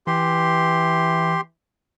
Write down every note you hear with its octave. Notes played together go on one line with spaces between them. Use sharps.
E3 G4 C6